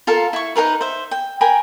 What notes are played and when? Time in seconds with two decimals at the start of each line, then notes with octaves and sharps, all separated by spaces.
0.07 F4 A4 A#4 F5
0.33 E4 C#6
0.56 D#4 G#4 A#4 B4
0.81 C5 E5
1.11 G5
1.41 A#4 G5 G#5 B5